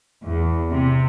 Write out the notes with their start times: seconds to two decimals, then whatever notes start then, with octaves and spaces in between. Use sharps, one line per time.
0.23 E2
0.69 C3